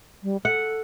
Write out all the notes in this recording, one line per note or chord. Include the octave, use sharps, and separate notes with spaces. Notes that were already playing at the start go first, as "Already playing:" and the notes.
G3
A4 F#5